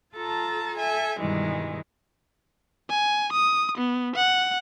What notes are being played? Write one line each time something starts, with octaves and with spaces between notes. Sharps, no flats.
F4 A4 A5 A#5
A4 E5 G#5
G2 B2 D#3 E3 G3 G#3
G#5
D#6
B3
F#5